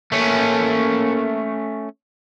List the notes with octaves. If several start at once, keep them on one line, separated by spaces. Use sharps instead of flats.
A3 A#3 C#4